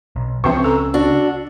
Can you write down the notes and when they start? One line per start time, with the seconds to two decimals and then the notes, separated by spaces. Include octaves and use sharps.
0.16 B1
0.44 C#2 C#3 F3 C4 B4 E5 C#6
0.64 A4 A#5 E6
0.94 D4 F#4